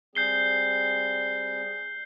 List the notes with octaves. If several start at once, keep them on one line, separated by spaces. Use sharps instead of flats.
G3 C4 G#4 G6 C7 G7